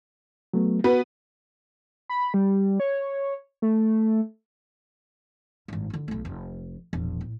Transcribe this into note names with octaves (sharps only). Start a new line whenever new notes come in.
F#3 A3 B3
B3 F#4 B4
B5
G3
C#5
A3
G#1 G2
D3 F4
B1 A3
F1
E1 A#1
A2